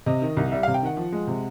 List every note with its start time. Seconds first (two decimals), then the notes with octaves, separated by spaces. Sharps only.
0.06 C3 D#5
0.22 D#3
0.37 C2
0.52 G3 E5
0.63 C3 F5
0.74 G5
0.82 D#3 F#5
0.97 F3
1.12 G#3
1.27 C3